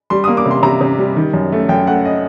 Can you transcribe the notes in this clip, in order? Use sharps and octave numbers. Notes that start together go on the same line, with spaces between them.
G3 C6
A#3 D#6
D6
C3
C6
C3 A#5
C3
G3
D#3
F#2
A3
F#2 G5
A3 F#5
D#5